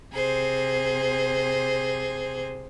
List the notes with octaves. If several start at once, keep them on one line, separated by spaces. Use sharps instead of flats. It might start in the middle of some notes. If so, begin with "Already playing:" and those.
C3 G#4 C5